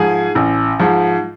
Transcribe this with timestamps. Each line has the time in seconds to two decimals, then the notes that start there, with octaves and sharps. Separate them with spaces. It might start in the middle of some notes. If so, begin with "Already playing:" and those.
Already playing: G#2 F3 G#4 G#5
0.35 A1
0.79 G#2 F3